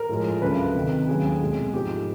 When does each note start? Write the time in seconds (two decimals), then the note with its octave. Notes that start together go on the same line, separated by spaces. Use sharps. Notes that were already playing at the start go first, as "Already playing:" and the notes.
Already playing: A#4
0.09 A2 F3 G#3
0.42 D2 C#3 F#3 A3 B4
0.75 C2 C3 D#3
1.08 D#2 C#3 F#3 A3 G#4
1.40 C2 B2 G#3
1.74 G#2 F3 A3 G4